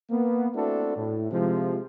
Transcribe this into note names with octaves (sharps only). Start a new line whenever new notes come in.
A#3 B3
A3 C4 D4 E4 F#4 A4
A2
C3 F3 G#3